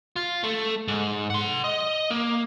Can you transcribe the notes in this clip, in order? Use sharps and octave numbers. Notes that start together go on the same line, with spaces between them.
F4
A3
G#2
F#5 C6
D#5
A#3